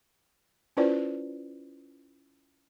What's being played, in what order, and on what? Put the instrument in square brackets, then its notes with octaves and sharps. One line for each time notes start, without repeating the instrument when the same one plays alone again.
[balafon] C#4 E4 F4 B4 C5 D5